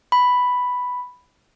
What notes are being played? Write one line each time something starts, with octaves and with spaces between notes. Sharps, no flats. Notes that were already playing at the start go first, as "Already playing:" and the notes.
B5